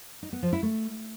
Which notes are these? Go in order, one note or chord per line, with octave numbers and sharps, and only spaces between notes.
D#4
B3
F3
E4
A3